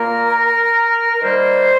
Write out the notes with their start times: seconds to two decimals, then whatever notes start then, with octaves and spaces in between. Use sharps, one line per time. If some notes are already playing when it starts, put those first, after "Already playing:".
Already playing: A#2 A#3 A#4
1.14 A#4
1.22 D#3 G3 A#3 C5